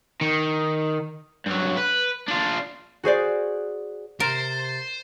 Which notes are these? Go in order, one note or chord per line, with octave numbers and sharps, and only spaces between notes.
D#3
G2 F#3
B4
D4 F4
F#4 G#4 C5 D5
C3 A#4 C5 C6 A6